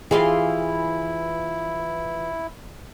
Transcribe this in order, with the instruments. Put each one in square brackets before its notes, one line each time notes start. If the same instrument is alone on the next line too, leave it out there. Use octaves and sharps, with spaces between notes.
[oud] E3 F4 G4 [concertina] E4 [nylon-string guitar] G#4